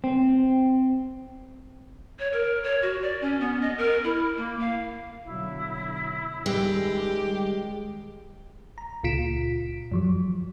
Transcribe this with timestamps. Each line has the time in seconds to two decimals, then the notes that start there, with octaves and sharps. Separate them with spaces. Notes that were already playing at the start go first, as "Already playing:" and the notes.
0.04 C4
2.19 C#5
2.33 A#4
2.64 C#5
2.82 F#4
3.02 D5
3.21 C#4
3.41 B3
3.61 D#5
3.78 A#4
4.04 E4
4.37 A#3
4.60 F5
5.24 B2 D3 F#3 E4
6.46 C#2 D#3 G3 G#3 G4
8.78 A#5
9.04 C#2 A#2 F4 B6 D7 E7
9.92 F#2 F3 F#3